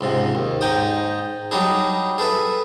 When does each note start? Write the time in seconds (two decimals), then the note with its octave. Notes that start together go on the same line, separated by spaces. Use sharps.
0.01 C#2 G#2 C3
0.35 D#2
0.61 G#2 D#4 G5 D#6
1.51 F#3 G3 D4 D#4 G#4
2.18 G#4 A4 B4 E5